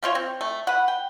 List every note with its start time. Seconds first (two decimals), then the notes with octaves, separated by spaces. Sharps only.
0.03 F3 A3 F4 C#5
0.15 C4
0.41 A3
0.67 B4 F#5
0.88 G5